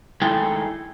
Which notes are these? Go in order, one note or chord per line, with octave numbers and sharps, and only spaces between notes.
D#3 G#3 A3 E4 G#4 G5